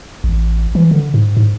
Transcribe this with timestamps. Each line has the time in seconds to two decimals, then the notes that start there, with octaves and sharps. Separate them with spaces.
0.24 A1
0.75 E3
0.91 D3
1.14 G#2
1.37 G#2